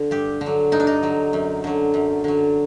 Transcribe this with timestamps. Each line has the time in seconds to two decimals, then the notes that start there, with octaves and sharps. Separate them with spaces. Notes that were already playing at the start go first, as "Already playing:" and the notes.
Already playing: D3
0.11 G2 G4
0.41 D3
0.46 F#3
0.72 G2 D#4
0.80 D4
0.87 D#4
1.03 D3 F#3
1.33 F#2
1.64 D3 F#3
1.94 F#2
2.24 D3 F#3